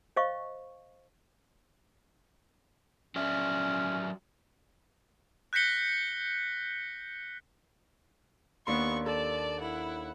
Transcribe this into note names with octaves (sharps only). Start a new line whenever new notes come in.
C5 D#5 F5 C#6
F#3 C#4 D5 E5
F#6 G6 A#6 B6 C#7 G7
D#2 B3 D4 C6 C#6
A4 D5 A5
E4 F#5